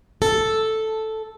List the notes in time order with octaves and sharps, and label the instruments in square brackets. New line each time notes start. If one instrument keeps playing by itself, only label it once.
[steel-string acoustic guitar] A4